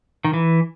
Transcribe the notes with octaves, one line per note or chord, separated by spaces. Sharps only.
D#3
E3